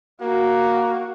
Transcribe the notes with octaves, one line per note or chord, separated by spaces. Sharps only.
A#3 F#4